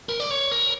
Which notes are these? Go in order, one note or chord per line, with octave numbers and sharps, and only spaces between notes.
A#4
D5
C#5
A#4